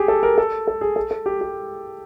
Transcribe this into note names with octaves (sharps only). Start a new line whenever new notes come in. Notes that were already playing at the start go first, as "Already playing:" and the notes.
Already playing: G4 G#4
A4
A#4
A4
A4
G#4
A4
A4
G4
G4